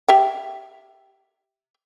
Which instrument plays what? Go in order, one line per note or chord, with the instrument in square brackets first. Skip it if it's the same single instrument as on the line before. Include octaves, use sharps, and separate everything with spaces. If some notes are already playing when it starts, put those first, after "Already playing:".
[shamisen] G4 E5 G5